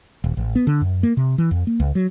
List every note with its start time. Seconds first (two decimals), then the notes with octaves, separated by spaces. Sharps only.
0.24 D#1
0.37 A1
0.55 B3
0.67 D3
0.81 F#2
1.03 A#3
1.17 C3
1.38 E3
1.51 F2
1.67 A#3
1.80 C#2
1.95 F#3